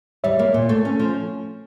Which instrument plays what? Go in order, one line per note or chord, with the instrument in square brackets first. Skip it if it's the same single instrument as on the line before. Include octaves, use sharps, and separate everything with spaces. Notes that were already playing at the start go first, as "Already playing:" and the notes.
[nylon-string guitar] G3 [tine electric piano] C#5 E5
[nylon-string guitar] A#3
A#2
A3
C#4
F3